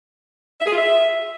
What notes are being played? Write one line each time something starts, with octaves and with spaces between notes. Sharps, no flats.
E5
G#4
F4
E5